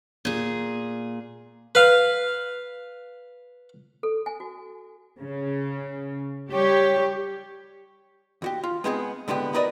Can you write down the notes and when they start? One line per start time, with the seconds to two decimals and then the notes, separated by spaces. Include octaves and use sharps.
0.25 A#2 G#4
1.75 B4 F5
4.03 A4
4.26 G#5
4.40 F#4
5.20 C#3
6.51 G3 G4 C#5 C#6
8.42 D#2 F#4 G4
8.63 F4
8.84 G#3 B3 C4 D#4 G4 G#4
9.28 A2 D3 G#3 B3 G4
9.54 D#4 F#4 A#4 B4 D5 D#5